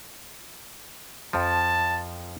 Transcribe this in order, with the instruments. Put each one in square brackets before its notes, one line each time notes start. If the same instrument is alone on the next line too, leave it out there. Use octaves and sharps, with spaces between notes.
[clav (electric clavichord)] F2 F3 [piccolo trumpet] A5